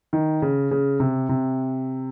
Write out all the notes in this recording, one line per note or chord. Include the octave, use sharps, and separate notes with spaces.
D#3
C#3
C#3
C3
C3